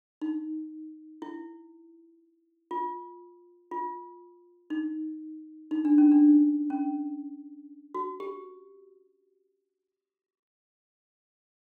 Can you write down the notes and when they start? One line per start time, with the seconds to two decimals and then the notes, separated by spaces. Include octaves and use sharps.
0.22 D#4
1.22 E4
2.71 F4
3.71 F4
4.70 D#4
5.71 D#4
5.85 D4
5.98 C#4
6.12 D4
6.70 C#4
7.94 F#4
8.20 G4